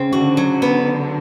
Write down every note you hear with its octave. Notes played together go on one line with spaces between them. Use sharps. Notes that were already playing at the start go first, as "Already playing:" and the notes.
Already playing: C#3 C4
D3 F#4
F#3
B3